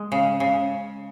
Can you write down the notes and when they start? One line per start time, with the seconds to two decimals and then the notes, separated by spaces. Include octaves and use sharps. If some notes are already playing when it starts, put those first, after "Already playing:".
Already playing: G#3
0.12 C#3
0.40 C#3